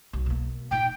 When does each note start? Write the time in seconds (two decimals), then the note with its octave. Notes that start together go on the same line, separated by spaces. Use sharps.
0.13 B1
0.26 B2 A#3
0.71 A#2 D#4 G5